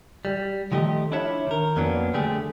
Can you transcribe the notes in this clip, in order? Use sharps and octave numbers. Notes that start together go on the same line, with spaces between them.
G3
D#3 F3 A3 G4 D#5
D4 E4 F4 C#5 E5
D#3 A#4
F2 F#3 A#3 B3 C#4 D4
D3 G3 A3 G4 G#4